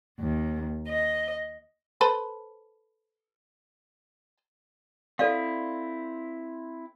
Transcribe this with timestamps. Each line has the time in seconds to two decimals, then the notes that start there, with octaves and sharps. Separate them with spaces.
0.19 D#2
0.88 D#5
2.01 A4 B4 C5
5.19 C4 E4 A4 D5 F5